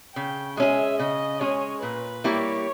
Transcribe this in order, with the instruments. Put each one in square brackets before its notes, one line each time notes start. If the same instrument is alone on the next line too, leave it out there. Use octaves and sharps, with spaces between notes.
[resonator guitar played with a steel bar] C#3 [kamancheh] G5
[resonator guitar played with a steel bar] G#3 C#4 G#4 [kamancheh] E5
[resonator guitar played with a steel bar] C#3 [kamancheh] D#5
[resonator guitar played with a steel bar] G#3 C#4 G#4 [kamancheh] C#5
[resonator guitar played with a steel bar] A#2 [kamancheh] B4
[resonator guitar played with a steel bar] G3 A#3 E4 G4 [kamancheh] C#5